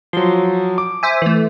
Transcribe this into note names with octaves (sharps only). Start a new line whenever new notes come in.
F3 F#3 C6
D6
C5 E5 G#5
E3 A3